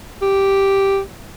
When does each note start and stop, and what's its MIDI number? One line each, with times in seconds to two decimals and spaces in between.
0.22 0.99 67